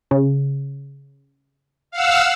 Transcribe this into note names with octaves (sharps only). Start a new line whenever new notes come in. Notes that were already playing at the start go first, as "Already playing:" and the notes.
C#3
F5 F#5 E6